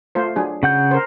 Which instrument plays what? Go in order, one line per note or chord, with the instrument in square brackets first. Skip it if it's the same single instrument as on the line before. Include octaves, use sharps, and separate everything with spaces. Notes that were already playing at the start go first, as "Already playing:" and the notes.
[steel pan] A3 F4 C5
F#3 D4 G#4
[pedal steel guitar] C#3 F#5 G6
[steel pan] A#4 C5